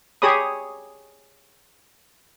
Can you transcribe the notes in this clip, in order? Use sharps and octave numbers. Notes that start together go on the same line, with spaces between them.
G4 G#4 C#5 B5 D#6